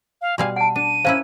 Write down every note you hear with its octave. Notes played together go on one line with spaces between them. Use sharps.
F5
B2 G3 F5 G#5 C6
F#5 A5 D7
D4 D#7
A#3 C#4 E4 C5 F5